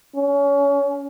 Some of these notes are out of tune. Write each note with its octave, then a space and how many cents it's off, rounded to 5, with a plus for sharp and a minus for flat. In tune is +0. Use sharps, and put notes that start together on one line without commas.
C#4 +25